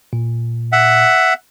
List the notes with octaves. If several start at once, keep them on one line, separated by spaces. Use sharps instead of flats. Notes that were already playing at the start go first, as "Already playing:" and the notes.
A#2
E5 F#5